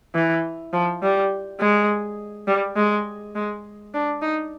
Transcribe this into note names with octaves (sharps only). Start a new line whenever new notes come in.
E3
F3
G3
G#3
G3
G#3
G#3
D4
D#4